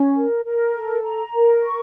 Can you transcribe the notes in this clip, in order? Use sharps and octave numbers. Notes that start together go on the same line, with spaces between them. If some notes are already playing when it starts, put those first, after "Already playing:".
Already playing: C#4
A#4
A#4
A4
A#5
A#4
C#6